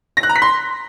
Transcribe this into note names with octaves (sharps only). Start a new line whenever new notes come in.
A#6
F#6
A#5
B6
C6